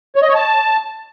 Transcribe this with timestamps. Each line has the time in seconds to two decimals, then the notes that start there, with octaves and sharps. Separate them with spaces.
0.16 C#5
0.22 D#5
0.28 C#5
0.35 A5